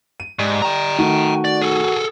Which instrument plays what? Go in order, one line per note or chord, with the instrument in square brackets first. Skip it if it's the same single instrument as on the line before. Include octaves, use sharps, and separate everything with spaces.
[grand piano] D#7
[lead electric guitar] G#2 [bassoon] G3
[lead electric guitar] G5 A#5
[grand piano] D#3 A3 [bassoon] F#4
[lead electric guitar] D5
G#4 A4